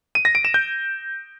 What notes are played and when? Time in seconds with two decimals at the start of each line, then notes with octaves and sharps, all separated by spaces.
0.15 D#7
0.25 A#6
0.35 D7
0.45 E7
0.54 G6